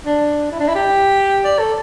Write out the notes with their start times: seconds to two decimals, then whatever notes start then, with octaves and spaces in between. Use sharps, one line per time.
0.06 D4
0.52 E4
0.60 D4
0.68 E4
0.75 G4
1.44 D5
1.59 A4